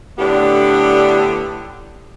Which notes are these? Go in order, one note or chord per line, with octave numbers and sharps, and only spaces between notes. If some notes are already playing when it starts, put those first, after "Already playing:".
A2 D3 B3 D4 G4